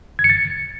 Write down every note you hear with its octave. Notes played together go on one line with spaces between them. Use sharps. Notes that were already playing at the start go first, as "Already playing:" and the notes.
G#6
C#7
A6